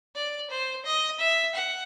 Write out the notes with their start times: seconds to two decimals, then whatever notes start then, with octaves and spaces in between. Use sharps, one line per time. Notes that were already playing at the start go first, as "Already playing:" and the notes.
0.15 D5
0.50 C5
0.85 D#5
1.20 E5
1.55 F#5